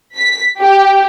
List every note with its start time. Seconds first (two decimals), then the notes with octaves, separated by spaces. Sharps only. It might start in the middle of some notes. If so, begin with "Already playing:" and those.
0.16 B6
0.61 G4